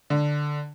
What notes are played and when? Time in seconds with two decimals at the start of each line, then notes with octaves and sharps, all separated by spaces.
0.10 D3